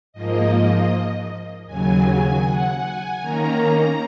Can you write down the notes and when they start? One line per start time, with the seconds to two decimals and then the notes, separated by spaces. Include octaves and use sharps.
0.13 G#2 F3 A#3 D#5
1.66 D#2 C#3 F#3 G#5
2.05 G#5
2.43 F#5
2.82 G#5
3.20 D#3 A#3 C#4 A#5